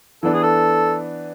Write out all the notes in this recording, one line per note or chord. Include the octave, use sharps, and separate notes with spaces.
E3 B3 D4 A4
G#4
A4